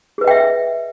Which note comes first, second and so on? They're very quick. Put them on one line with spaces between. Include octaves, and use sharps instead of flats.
G#4 B4 D#5 G5 E5